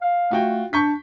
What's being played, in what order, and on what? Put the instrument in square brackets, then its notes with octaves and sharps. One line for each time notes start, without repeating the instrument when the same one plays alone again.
[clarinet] F5
[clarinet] A3 [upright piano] F4 F#4 G5
[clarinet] D4 [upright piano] C#6 G6 B6